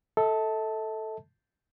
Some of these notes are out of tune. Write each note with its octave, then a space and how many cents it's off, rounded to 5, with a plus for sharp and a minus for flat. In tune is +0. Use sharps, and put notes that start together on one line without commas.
A4 +0 E5 -45 A5 +0